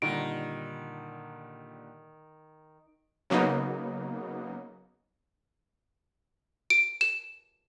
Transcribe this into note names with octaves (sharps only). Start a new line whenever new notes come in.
A#2 D3 D#3 G3 D7
C#3 F#3 A#3 B3 D#4
D7
E7